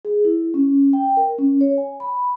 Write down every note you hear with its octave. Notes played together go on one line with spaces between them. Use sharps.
G#4
E4
C#4
G5
A#4
C#4
C#5
G#5
B5